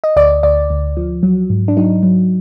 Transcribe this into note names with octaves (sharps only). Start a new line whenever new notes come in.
D#5
D2 D5
D2 D5
D2
F3
F#3
G#2
D4
F#3 D#4
F#3